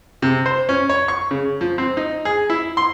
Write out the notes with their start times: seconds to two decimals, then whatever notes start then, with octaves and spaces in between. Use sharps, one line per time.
0.22 C3
0.46 C5
0.69 C#4
0.89 C#5
1.08 C#6
1.31 C#3
1.61 F3
1.78 C4
1.97 D#4
2.25 G#4
2.50 E4
2.77 C6